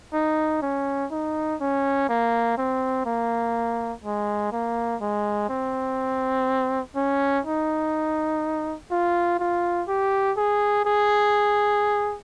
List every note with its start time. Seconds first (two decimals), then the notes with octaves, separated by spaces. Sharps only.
0.13 D#4
0.62 C#4
1.12 D#4
1.61 C#4
2.09 A#3
2.58 C4
3.05 A#3
4.04 G#3
4.52 A#3
5.01 G#3
5.49 C4
6.96 C#4
7.45 D#4
8.91 F4
9.39 F4
9.88 G4
10.37 G#4
10.85 G#4